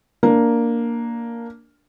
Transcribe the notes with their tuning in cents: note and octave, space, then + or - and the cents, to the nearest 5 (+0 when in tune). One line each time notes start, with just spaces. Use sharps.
A#3 +0 D4 +0